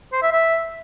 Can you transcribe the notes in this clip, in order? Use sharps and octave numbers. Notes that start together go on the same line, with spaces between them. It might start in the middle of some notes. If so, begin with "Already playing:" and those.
C5
E5
E5